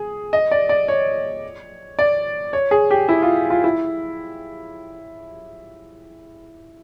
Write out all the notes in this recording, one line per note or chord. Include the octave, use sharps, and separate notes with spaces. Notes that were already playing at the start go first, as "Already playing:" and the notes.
Already playing: G#4
D#5
D5
D5
C#5
D5
C#5
G#4
G4
E4
F4
F4
E4